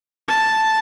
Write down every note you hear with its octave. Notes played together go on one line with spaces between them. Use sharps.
A5